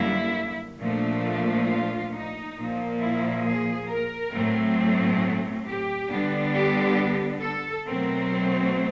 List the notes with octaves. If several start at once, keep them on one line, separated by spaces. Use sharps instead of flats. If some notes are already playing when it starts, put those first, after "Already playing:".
Already playing: F#2 D3 G3 A#3 E4
A#2 F3 A3 D4
F4
D#4
A#2 F3 A#3
E4
G#4
A#4
A2 F#3 A3 C4
G4
D3 G3 B3 D4
G4
A4
B2 F#3 A3 C4 A#4